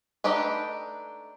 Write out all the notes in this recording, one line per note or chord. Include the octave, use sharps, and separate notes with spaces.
A3 D4 D#4 G4 B4